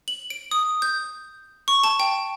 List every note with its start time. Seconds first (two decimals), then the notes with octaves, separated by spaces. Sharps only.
0.08 F#7
0.30 D7
0.51 D#6
0.82 G6
1.68 C#6
1.84 A5
2.00 G5